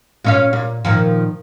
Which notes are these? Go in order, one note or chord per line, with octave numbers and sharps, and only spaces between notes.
A#2 C#4 F5
A#2
A#2 D#3 F3